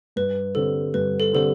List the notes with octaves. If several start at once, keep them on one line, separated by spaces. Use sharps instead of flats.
G2 B4
D3 G3 C4 A4
G2 B4
A4
D3 G3 C4 A4